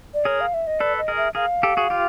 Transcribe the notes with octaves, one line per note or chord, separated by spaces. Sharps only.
D5
G#4 A#4 C#5
F5
E5
D#5
A4 B4 D5
D#5
G#4 A#4
E5
G#4 A#4 F5
G4 A4
F#4 G#4
F4 G4